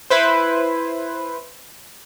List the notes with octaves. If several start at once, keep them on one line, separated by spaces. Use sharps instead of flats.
E4 B4 C5